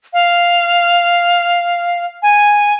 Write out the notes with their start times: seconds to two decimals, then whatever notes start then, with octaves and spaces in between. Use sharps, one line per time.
0.13 F5
2.23 G#5